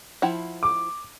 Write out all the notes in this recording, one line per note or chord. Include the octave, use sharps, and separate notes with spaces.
F3 E4 F#5
D6